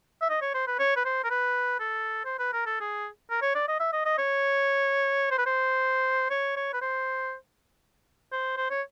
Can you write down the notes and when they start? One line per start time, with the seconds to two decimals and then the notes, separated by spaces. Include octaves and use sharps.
0.21 E5
0.30 D#5
0.41 C#5
0.54 C5
0.67 B4
0.79 C#5
0.96 B4
1.05 C5
1.24 A#4
1.30 B4
1.80 A4
2.25 C5
2.39 B4
2.53 A#4
2.66 A4
2.80 G#4
3.30 A#4
3.42 C#5
3.55 D5
3.68 D#5
3.80 E5
3.93 D#5
4.05 D#5
4.18 C#5
5.31 C5
5.38 B4
5.46 C5
6.30 C#5
6.56 C#5
6.73 B4
6.81 C5
8.32 C5
8.57 C5
8.70 C#5